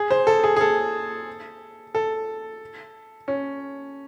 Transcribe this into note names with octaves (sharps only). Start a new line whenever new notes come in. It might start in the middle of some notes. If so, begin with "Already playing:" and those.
Already playing: G#4
C5
A4
G#4
G#4
A4
A4
C#4